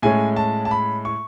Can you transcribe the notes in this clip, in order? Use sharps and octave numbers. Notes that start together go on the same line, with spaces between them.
A2 G#3 C#4 G#5
A5
A5
B5
C#6